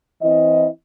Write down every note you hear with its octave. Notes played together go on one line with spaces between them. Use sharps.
E3 C4 E4 D#5